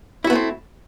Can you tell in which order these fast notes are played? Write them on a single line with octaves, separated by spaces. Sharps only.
E4 F#4 B3 A3 C4